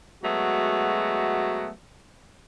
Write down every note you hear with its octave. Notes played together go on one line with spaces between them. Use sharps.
F#3 G#3 A3 B3 F#4